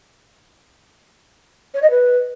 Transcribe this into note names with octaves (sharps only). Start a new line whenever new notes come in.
C#5
D#5
B4